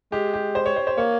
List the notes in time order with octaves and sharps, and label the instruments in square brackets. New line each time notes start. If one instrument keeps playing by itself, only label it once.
[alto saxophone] G#3 [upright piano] G4
[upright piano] G4
C5
C#5
C5
C5
[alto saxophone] A#3 [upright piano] C#5